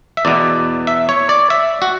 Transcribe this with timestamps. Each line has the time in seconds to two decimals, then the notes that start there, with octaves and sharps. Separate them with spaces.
0.17 E5
0.25 E2 B2 D5
0.87 E5
1.09 C#5
1.29 D5
1.50 E5
1.82 F#4